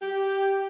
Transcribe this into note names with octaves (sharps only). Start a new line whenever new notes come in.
G4